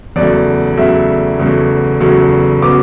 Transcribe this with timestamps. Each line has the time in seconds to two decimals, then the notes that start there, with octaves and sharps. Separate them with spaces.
0.16 E2 C#3 F#3 A3 D5
0.77 E2 C#3 F#3 A3 E5
1.40 E2 C#3 F#3 A3
2.01 E2 C#3 F#3 A3
2.62 C#3 F#3 B3 D6